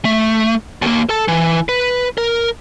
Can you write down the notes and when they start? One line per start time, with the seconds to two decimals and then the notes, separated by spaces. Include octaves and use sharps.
0.05 A3
0.82 D#2 A#3
1.09 A4 A5
1.28 E3
1.69 B4
2.18 A#4